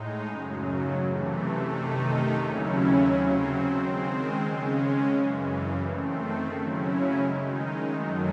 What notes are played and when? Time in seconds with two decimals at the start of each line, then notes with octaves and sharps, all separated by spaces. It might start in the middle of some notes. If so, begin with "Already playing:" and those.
Already playing: A2 G#3 D#4
0.27 F#2 C#3 F#3
0.96 C3 E3 A3
1.65 C3 D#3 A3 D#4
2.35 D#2 C#3 F#3 C#4 E4
3.03 C#3 F#3 C4
3.72 D#3 G#3 C4
4.41 C#3 G#3 C#4
5.10 F#2 C#3 E3
5.79 D#3 A3 C4
6.48 C#3 F#3 C#4 E4
7.17 D#3 G#3 D#4
7.87 F#2 D#3 F#3 A3